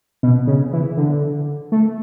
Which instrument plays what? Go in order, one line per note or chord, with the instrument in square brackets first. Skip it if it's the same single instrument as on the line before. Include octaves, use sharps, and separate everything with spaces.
[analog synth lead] B2
C#3
E3
D3
A3